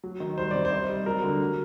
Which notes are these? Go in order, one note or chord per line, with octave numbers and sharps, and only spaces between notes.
F#3
D#3
G3 C5
C3 D5
C5
D#4
G3
F#3 A#4
D3
F#3